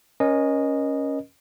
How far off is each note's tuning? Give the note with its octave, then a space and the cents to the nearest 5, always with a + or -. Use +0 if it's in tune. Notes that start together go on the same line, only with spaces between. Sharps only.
C#4 +0 A#4 +40 D#5 -10